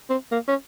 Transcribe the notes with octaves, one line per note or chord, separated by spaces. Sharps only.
C4
A#3
C#4